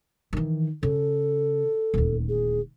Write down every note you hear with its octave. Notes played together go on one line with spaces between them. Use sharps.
D#3 E3
C#3 A4
D#1 D2
G#4